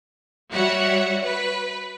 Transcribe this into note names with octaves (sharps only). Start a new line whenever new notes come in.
G3 F#4 C#5 E5 F#5
B4